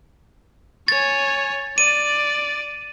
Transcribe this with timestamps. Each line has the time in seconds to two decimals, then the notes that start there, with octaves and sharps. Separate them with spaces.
0.88 C#5 G#5 A6
1.78 D5 D#7